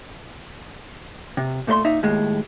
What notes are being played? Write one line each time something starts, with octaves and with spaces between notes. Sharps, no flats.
C3
A#2 A3 D5 C6
A#2 D#4 E5
D#2 A2 G#3